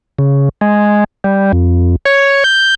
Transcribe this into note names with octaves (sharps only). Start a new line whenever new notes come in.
C#3
G#3
G3
F2
C#5
G6